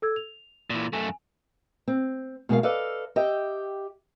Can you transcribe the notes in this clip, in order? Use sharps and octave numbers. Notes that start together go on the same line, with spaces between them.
A4 E6 G#6
F7
A#2 E3
F#2 A3 G#5
C4
B2 G#3 A#4 F5
A4 B4 D5 D#5 F5
G4 D#5 E5 G5